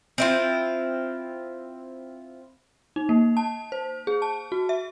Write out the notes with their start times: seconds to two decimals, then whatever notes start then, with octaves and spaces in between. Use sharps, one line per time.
0.18 C4 E4 F4
2.96 D#4
3.09 A#3
3.37 A5
3.72 C5
4.07 G#4
4.22 A5
4.52 F#4
4.69 E5